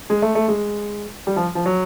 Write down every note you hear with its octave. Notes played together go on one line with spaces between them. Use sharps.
G#3
A3
A3
G#3
G3
F3
F3
F#3